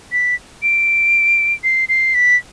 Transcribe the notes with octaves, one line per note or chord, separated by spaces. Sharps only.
B6
D7
C7
C7
B6